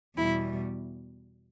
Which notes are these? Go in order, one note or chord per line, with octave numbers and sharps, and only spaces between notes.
E2 B2 G3 E4